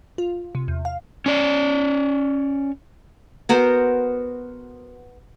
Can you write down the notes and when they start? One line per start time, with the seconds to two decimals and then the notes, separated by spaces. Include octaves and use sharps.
0.18 F4
0.55 C3
0.68 E2
0.85 F5
1.26 C#4 D5
3.49 B3 F#4 A#4 C5